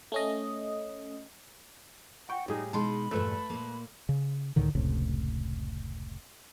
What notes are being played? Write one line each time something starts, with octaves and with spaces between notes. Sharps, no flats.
A3 C#4 D#5
F#5 G5 C#6
A2 G3 D#4 G#4
B2 G#3 D#4 A5 B5 C6
E2 G2 A#2 A3 A4 B4
A#2 A#3
C#3
C#2 A2 D3 D#3
F1 C#2 A2 C3